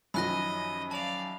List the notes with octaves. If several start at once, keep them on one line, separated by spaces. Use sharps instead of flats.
F#2 D#3 F3 D#5 B5 F#6 A#6
D5 F5 A5 F7